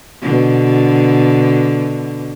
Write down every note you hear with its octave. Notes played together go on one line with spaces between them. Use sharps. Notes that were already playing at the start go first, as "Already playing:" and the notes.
B2 D3